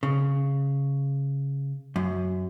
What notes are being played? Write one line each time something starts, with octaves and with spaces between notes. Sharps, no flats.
C#3
F#2